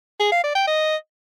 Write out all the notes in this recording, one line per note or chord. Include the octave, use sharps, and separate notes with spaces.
G#4
F5
D5
G5
D#5